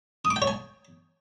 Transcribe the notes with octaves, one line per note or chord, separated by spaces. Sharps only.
D#6
D6
G5
C#5
G#5